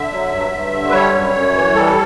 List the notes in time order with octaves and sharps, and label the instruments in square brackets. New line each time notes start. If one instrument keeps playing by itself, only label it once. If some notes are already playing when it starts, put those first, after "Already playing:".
Already playing: [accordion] D3 E5
F#3
G2
G2
D3
B4
G3 C#5
F#2
F#2
E3
G3 A4